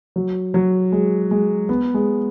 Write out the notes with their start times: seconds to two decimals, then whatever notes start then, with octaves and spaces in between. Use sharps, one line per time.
0.16 F#3
0.54 F#3
0.92 G#3
1.31 G#3
1.69 B3
1.94 G#3